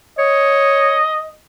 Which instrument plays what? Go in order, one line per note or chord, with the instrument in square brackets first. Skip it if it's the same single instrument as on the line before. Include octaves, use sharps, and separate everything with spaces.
[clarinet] C#5 [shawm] D#5